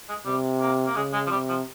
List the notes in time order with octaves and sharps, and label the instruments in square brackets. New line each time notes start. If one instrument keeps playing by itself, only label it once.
[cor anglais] G#3
[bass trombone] C3 [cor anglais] G3
[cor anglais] A#3
A#3
[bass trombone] C#3 [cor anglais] G#3
[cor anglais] G#3
F3
[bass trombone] C3 [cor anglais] G3
[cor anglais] F3